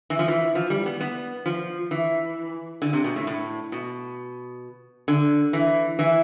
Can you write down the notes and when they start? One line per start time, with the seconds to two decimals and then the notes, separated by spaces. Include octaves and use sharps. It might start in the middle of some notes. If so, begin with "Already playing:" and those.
0.10 E3
0.19 F3
0.28 E3
0.55 F3
0.70 G3
0.86 B3
1.01 B3
1.46 F3
1.91 E3
2.82 D3
2.93 C3
3.04 B2
3.16 A2
3.27 A2
3.72 B2
5.08 D3
5.53 E3
5.99 E3